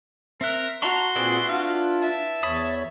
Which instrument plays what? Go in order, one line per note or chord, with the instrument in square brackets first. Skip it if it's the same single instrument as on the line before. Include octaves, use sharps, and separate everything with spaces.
[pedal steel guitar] C4 F#6 [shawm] A#4 [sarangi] E5
[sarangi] F#4 [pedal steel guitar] A5 A#5 C#6 [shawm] C6
[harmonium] A#2 C4 G#4 [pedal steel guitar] E4 B4 D5
[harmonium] D4 F4 [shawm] F5
[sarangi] E5 [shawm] A5
[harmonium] E2 C#5 [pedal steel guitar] B5 D#6